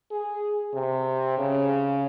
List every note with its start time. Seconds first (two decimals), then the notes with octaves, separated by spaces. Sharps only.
0.11 G#4
0.74 C3
1.38 C#3